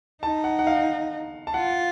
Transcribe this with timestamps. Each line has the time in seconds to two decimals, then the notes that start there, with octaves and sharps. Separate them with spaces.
0.23 D#4 A5
0.44 F#5
0.59 F#5
0.67 F5
1.47 A5
1.54 F4 F#5